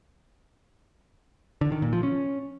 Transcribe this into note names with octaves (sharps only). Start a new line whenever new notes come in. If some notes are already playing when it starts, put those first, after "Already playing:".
D3
D#3
A#2
F3
C#4